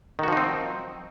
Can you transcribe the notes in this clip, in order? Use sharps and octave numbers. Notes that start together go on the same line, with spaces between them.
D#3 F3 C4 D#4 F#4